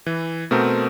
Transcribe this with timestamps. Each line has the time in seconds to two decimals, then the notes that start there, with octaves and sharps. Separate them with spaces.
0.06 E3
0.51 B2 A3 C4 A#4 G6